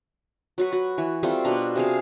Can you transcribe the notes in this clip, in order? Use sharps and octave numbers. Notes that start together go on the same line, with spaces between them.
F#3 F#4 B4
F#4
E3
G3 A3 C4 F4
B2 D4 A#5
C3 G#4 F5